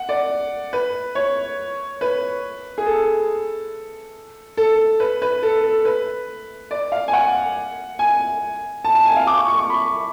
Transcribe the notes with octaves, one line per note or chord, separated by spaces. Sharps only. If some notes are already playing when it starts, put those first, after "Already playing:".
Already playing: F#5
D5
B4
C#5
B4
G#4
A4
A4
B4
B4
A4
A4
B4
D5
F5
G#5
F#5
G#5
A5
A5
G#5
F5
D6
C#6
C#6
C#6
B5